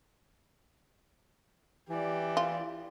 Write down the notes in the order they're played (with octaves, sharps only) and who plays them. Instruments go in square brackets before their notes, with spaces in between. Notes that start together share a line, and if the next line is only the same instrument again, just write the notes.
[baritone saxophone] E3 [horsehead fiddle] G4 D5
[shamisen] F4